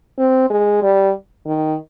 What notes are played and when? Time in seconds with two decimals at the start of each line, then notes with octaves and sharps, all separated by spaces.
0.18 C4
0.50 G#3
0.82 G3
1.46 D#3